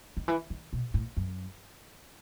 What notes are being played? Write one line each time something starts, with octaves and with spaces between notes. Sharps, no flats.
D#3
E3
D#3
B2
A2
F#2